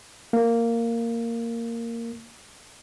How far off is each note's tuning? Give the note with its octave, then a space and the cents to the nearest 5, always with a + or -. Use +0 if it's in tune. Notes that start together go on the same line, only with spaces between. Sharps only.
A#3 -10